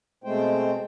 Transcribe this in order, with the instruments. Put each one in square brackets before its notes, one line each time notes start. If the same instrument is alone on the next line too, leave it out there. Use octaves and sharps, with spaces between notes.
[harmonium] B2 G#3 A3 C4 C5 G5